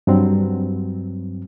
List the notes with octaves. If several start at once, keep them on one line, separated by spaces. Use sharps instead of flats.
G2 F#3 C4